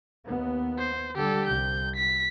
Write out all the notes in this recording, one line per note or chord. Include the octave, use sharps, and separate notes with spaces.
D#2 B3
C5
D3 G3 G4 A4
C2 G6
B6